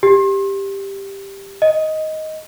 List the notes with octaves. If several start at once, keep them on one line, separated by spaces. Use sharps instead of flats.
G4
D#5